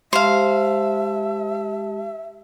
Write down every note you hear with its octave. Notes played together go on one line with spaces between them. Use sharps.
G#3 G4 C5 E5 F5 A5